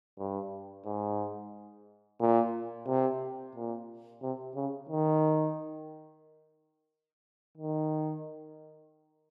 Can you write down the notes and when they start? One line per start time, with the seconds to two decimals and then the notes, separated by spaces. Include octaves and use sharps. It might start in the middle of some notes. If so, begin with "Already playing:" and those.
0.19 G2
0.85 G#2
2.20 A#2
2.88 C3
3.55 A#2
4.22 C3
4.55 C#3
4.89 D#3
7.58 D#3